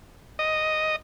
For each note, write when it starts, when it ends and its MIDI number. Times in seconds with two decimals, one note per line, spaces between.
0.39 0.96 75